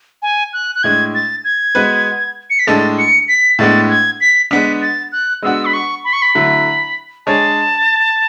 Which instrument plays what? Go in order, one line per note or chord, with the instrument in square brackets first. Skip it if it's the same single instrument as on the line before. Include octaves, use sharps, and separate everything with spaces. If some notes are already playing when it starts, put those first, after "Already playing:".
[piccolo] G#5
F#6
F#6
[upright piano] A2 G#3 D4 [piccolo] G#6
[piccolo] A6
G#6
[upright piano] G#3 B3 F#4 B4
[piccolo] C#7
B6
[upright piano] A2 G#3 D4 A4 [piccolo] A6
[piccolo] C#7
B6
[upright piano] A2 G#3 B3 D4 [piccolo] A6
[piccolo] G#6
B6
[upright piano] G#3 B3 D4 [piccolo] B6
[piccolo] A6
F#6
[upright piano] G#3 B3 D4 F#4 [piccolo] E6
[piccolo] B5
C#6
B5
C#6
B5
[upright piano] D3 F#3 A3 E4
[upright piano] G#3 D4 G#4 C#5 [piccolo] A5